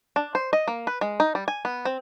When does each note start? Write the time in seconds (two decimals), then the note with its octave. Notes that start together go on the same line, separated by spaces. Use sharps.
0.16 D4
0.35 C5
0.53 D#5
0.68 A#3
0.87 B4
1.01 G#3
1.20 D#4
1.35 G3
1.48 G#5
1.65 B3
1.85 C4